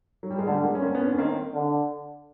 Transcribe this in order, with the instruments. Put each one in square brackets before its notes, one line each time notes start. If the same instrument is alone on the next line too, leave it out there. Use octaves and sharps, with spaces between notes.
[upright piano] F#3
G3
G#3
[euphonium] D3 [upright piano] G3 A3
[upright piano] G#3 A#3
C#4
A#3 C4
B3 C#4
C4 D4
C#4
[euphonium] D#3 [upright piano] A#3 C4
[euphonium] D3